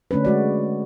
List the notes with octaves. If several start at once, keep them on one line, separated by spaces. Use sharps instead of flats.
D3 A3 C#4 D4 B4
G#3 F#4 D5